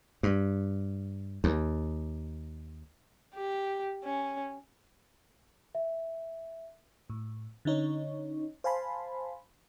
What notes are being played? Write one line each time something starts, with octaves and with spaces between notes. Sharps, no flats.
G2
D#2
G4
C#4
E5
A2
D3 C#4 D#4 C#5
C5 F5 G#5 A5 B5 C6